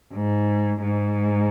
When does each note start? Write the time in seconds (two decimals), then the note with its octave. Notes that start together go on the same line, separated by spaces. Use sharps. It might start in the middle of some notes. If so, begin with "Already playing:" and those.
0.14 G#2
0.82 G#2